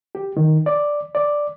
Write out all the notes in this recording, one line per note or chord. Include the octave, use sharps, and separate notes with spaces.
G4
D#3
D5
D5